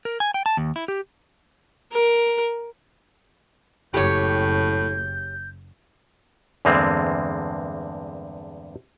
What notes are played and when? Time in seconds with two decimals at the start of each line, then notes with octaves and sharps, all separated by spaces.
0.05 A#4
0.20 G#5
0.34 G5
0.46 A5
0.57 D#2
0.76 E4
0.88 G4
1.93 A#4
3.94 F#1 A2 G4 C#5 G6
6.65 E2 G2 D3 G#3 A#3 C4